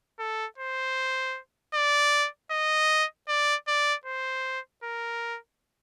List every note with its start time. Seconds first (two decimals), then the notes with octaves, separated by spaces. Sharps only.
0.19 A4
0.58 C5
1.74 D5
2.51 D#5
3.28 D5
3.68 D5
4.06 C5
4.84 A#4